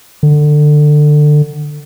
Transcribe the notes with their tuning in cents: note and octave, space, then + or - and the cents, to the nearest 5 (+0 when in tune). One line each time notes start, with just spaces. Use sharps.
D3 +20